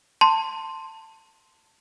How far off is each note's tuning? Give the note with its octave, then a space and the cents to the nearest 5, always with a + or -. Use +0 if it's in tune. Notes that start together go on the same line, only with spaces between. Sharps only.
A5 +15 C6 +0